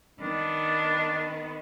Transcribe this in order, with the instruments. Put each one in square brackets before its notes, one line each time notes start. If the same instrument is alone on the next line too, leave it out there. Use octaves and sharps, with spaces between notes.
[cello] D#3 B3 [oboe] D4